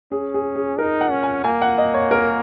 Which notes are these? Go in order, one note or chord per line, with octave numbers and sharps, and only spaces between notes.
C#4 G#4
G#4
G#4
D#4 A#4
F#5
C#4
G#5
A#3 G#5
F#5
D#5
C#5
A#4